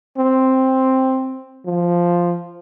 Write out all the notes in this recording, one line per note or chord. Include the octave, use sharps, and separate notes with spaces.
C4
F3